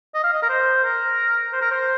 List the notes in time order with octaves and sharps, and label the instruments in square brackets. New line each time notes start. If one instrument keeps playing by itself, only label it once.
[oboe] D#5
F5
D#5
A#4
C5
A#4
C5
A#4
C5